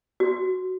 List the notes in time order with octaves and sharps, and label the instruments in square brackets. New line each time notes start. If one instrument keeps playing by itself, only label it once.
[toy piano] F#4